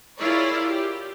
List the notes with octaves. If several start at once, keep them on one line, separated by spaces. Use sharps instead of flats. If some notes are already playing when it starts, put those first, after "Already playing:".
E4 F4 G#4 A#4 C#5 D5
G4